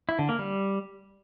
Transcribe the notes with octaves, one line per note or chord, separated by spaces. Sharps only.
E4
D3
A#3
G3